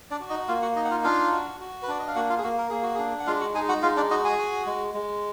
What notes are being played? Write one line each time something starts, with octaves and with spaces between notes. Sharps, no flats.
D4 D5
F#4
D#4 D#5
A#3 F4 F5
F#4 F#5
D#4 D#5
F#5
F4 F5
D4 F4 F5
F#4
F#4
B4
D4 D5
D#5
F5
A#3 F#4 F#5
F4 F5
G#4
A#3 F#4
A#4
A#3 G#4
F#4
D4 G#4
F#5
G#3 F4 F5
F#4 F#5
D#4 G#4 G#5
F#4 F#5
G#3 F4 F5
D4 D5
D#4 F#4 D#5
G#4 G#5
F#4
G#3
G#3